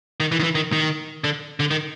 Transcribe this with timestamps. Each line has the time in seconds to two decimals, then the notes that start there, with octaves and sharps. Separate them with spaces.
0.20 D#3
0.32 E3
0.40 D#3
0.43 E3
0.55 D#3
0.72 D#3
1.24 D3
1.60 D3
1.71 D#3